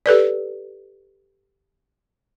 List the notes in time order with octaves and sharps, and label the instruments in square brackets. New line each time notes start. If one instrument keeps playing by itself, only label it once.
[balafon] G4 A4 B4 D5